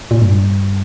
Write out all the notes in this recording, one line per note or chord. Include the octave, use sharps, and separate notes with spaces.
A#2
G2